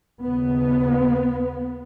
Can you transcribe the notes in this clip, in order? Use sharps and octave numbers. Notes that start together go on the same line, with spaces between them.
D#2 C#3 B3